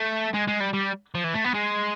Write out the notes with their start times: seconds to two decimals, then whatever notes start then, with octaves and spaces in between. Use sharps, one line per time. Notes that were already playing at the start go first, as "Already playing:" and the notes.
Already playing: A3
0.34 G#3
0.48 G#3
0.60 G3
0.74 G3
1.15 F3
1.24 E3
1.34 A3
1.44 B3
1.54 G#3